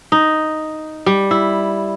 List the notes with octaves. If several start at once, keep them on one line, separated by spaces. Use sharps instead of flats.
D#4
G3
E4